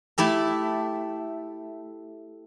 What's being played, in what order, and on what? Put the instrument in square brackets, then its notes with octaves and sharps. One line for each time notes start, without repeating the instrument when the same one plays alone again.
[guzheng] A3 E4 G4 A4